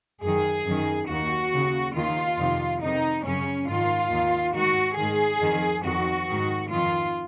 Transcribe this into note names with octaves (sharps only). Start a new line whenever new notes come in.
F#2 D#3 G#4
F#2 D#3
D#2 D#3 F#4
D#2 C#3
D#2 D#3 F4
F2 C3 D#3
F2 C3 D#3 D#4
F#2 C#3 C#4
G#2 D#3 F4
D#2 D#3
G#2 D#3 F#4
G#2 D#3 G#4
F2 D#3
F2 D#3 F#4
G#2 D#3
F2 D#3 F4